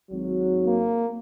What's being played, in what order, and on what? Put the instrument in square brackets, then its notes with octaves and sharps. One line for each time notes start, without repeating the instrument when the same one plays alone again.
[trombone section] G#1 F#3
[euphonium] A#3